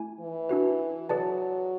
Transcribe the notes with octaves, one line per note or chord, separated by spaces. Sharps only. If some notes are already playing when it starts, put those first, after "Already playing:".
Already playing: A3 E4 G#5
E3
D4 F#4 B4
F#3 G#4 B4 D5 A5